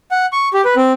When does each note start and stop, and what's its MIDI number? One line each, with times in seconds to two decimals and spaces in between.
0.11 0.26 78
0.33 0.49 85
0.54 0.61 67
0.65 0.75 71
0.77 0.92 60